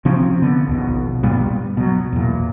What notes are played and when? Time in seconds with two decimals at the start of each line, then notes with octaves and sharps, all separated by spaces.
0.05 C3 F3 C4 C#4
0.42 D3 B3
0.67 A#1 D#2 B2
1.23 G2 A#2 G3 B3
1.77 B2 F#3
2.12 E2 A#2